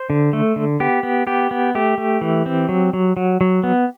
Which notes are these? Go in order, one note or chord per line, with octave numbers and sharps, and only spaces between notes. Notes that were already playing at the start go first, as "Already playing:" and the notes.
Already playing: C5
D3
A3
D3
B3 G4
B3
B3 G4
B3
A3 G4
A3
E3
C4
F#3
F#3
F#3
F#3
B3